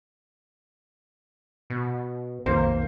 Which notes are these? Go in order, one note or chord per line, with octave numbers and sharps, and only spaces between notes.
B2
B1 F2 D#3 A#3 C5